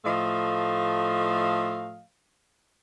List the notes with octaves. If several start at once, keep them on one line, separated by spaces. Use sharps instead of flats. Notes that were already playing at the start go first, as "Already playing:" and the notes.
A2 F3 A3 D#5 F5